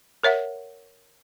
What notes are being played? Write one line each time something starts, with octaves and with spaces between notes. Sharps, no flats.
A#4 C#5 E5 F#5